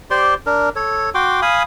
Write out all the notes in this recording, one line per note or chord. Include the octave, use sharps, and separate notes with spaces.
G4 C5 D5 C6
D4 A#4
A4 C#5
F#4 G5 C6 D6
F5 G#5 B5 D#6